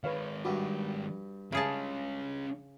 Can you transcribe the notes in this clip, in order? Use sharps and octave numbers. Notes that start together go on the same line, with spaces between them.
D#3 G#3 B4 C#5 F5
G2 G3 F#4
C#3 G#3 C#4 G#4 A5